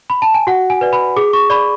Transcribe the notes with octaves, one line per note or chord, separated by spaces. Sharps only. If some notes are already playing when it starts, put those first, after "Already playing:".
B5
A5
G#5
F#4 F#5
G#5
B4 D5
B5
G#4 D6
C#6
D5 B5